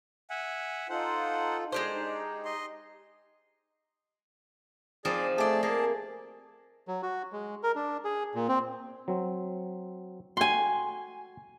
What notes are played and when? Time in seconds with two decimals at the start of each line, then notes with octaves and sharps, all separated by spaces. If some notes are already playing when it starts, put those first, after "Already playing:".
0.30 E5 F#5 G#5
0.89 D#4 F4 A4 C5 F#5
1.72 G#3 D4 G4 C5
1.94 D#4
2.45 D#5 C6
5.05 F3 C4 D#4 G#4 D5
5.38 A3 G4 G#4 D5 A5
5.63 A#3 G#4 A5
6.88 F#3
7.03 F#4
7.33 G#3
7.63 A#4
7.75 D4
8.05 G#4
8.35 A#2
8.48 C4
9.08 F#3 C4
10.37 F#4 G5 G#5 C6